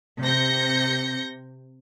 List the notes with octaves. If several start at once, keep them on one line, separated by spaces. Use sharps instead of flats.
C3 G6 A#6 C#7